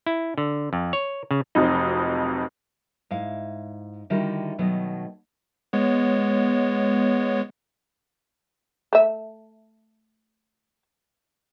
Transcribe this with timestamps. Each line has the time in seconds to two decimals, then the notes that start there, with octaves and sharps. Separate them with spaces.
0.06 E4
0.38 D3
0.73 F2
0.93 C#5
1.31 C#3
1.55 F1 F2 F#3 D#4
3.11 G#2 E4 F5
4.10 D3 D#3 G3 E4 F#4 A#4
4.59 B2 D#3 F#3 A3 B3
5.73 G#3 B3 C#5
8.93 A3 E5